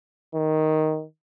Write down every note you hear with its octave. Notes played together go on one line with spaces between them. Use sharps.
D#3